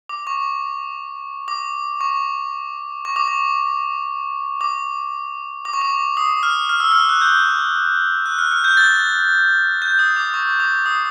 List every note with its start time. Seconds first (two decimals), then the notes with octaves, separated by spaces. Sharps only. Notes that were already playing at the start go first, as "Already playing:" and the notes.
0.09 D6
0.27 C#6
1.48 D6
2.01 C#6
3.05 C#6
3.16 D6
3.28 C#6
4.61 D6
5.65 D6
5.73 C#6
5.82 D6
6.17 D#6
6.43 F6
6.69 F6
6.80 E6
6.92 F6
7.09 F#6
7.21 G6
8.26 F#6
8.39 F6
8.51 F6
8.64 G6
8.77 A6
9.82 G6
9.99 D#6
10.16 D6
10.34 C#6
10.60 D6
10.86 D#6